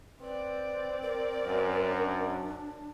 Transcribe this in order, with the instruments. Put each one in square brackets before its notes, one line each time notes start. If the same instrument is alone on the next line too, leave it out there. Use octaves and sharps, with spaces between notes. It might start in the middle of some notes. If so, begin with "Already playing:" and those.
[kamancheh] C4 D5 [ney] B4
[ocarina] A#4
[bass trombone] F#2 [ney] G#5
[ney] D4